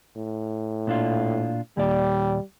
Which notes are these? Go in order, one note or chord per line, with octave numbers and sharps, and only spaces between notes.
A2
A#2 D4 F4
D#2 A#2 G3 D5